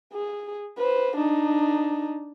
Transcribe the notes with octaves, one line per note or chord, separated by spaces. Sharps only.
G#4
B4 C5
D4 D#4